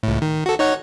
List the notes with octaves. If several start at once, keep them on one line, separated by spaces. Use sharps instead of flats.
C#2 A2
D#3
F#4 A4
D#4 C#5 F#5